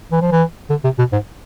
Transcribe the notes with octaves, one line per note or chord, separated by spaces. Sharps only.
E3
F3
E3
D3
C3
B2
G#2